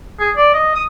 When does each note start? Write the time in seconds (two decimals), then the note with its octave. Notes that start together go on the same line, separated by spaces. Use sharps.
0.20 G#4
0.37 D5
0.54 D#5
0.75 D#6